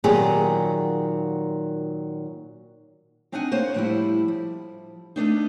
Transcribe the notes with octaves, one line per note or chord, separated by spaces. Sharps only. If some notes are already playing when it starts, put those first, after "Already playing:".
A#2 D#3 F#3 B3 G4 G#4
C4 D4 D#4 D#5 F#5 G#5
A#3 C5 C#5 F#5
A2 F3 G3 E4
F3
A3 B3 D4 D#4